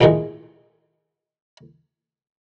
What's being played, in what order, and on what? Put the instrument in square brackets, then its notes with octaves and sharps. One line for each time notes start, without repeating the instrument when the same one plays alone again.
[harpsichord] A1 E2 A#2 D#3 G#3